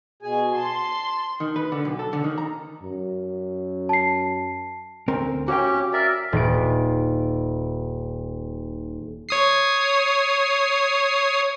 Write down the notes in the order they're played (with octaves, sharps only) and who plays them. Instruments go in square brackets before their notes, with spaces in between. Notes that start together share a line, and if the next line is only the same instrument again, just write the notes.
[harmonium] B2 G#4 G#5
[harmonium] A5 [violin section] C6
[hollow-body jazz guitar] D#3
B4
D3
B1
A4
D3
D#3
A#5
[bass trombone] F#2
[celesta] A5 C7
[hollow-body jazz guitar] D2 C4 A#4
[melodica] C#4 G4 [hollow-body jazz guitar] F#4 F5 G5
[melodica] A#4 D5 E5
[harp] D#1 D7
[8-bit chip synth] C#5 D#6 C7